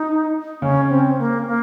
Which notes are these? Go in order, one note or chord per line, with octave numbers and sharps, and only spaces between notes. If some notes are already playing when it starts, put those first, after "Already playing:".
Already playing: D#4
C#3 C#4
C4
A#3
A#3